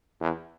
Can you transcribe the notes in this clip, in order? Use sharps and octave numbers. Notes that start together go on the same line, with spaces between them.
E2